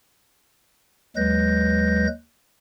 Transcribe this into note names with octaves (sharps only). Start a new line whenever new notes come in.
D#2 F#3 G#3 B4 G6 A#6